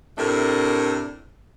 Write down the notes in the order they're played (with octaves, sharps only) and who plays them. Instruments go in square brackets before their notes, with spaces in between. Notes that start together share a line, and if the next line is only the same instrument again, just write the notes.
[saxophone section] A2 C3 A3 D4 A#4